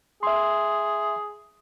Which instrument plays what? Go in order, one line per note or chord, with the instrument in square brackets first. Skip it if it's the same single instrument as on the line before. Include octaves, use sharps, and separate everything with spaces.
[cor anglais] G#4 [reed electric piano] E5 C6